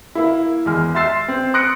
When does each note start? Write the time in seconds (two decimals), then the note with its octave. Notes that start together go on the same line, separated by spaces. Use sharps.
0.15 A#3 E4
0.66 E2 G#3 F6
0.94 E5 C6 E6 A6 C7 E7
1.28 C4
1.54 C6 D#6 F#6 A#6 C#7 D7